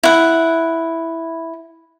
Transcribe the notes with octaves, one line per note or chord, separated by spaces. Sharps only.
E4 F#5